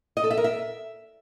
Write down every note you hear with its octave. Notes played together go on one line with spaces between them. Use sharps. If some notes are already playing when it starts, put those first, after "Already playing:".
D#5
A4
E5
A#4
E5